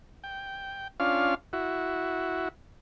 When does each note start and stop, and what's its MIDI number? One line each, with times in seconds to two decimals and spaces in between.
0.24 0.88 79
1.00 1.35 61
1.00 1.35 62
1.00 1.35 65
1.00 1.35 77
1.53 2.48 64
1.53 2.48 66